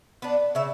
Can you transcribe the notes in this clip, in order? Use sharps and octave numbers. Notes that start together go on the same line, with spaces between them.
B3 D4
C#3 E5